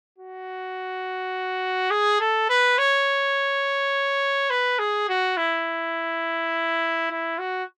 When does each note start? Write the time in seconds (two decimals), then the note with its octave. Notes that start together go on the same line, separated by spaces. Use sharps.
0.18 F#4
1.91 G#4
2.20 A4
2.50 B4
2.78 C#5
4.50 B4
4.79 G#4
5.09 F#4
5.37 E4
7.11 E4
7.39 F#4